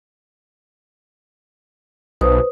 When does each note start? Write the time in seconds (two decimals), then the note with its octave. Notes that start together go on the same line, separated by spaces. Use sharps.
2.21 B1 B4 C5 D#6